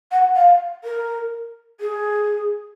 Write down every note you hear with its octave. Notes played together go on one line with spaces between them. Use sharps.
F#5
F5
A#4
G#4